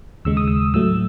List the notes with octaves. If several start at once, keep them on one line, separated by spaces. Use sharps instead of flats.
D#2 C#3 G#3 E6
D#6
E6
A2 F#3 A3 E6